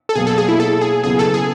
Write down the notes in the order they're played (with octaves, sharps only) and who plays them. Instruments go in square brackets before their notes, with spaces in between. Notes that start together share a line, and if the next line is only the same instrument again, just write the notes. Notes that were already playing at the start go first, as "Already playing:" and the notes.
[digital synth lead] A4
[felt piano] B2 F#3 A#3 [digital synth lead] G#4
[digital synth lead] A4
G#4
E4
A4
G#4
[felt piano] C#3 F#3 B3 E4 [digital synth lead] G#4
[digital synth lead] A4
G#4